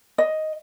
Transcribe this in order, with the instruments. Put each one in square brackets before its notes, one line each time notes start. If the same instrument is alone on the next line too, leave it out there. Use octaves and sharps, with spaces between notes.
[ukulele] D#5